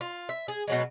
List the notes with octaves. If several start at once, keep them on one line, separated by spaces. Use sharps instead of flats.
F4
E5
G#4
B2 F#3 G#3